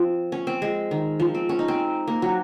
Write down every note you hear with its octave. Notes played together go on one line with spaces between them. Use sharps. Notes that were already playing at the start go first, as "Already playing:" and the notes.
Already playing: F3 C4
C#4
C4
G#3
D#3
F3
C4
C#4
D#4
C4
A#3
F#3